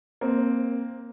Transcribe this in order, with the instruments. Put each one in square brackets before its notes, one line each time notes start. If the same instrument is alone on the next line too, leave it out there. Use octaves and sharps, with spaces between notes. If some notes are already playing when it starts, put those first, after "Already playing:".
[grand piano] A#3 C4